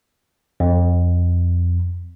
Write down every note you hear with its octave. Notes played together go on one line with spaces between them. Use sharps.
F2